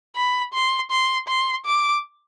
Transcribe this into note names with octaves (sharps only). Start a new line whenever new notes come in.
B5
C6
C6
C6
D6